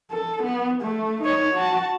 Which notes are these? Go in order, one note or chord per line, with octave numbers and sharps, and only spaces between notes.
A4
B3
A3
D#4 C#5
F#4 A5